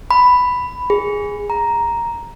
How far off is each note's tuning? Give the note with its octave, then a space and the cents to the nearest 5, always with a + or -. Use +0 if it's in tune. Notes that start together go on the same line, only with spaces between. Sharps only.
B5 +5
G#4 -10
A#5 +5